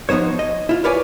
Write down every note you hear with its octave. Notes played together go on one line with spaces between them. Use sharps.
F3 B3 D#4 C5 C#5
D#5
E4 F4
A#4 B4 C#5 D5 F5 G#5